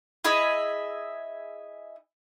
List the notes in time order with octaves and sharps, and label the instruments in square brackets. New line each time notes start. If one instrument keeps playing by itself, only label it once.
[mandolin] E4 G#4 D#5 E5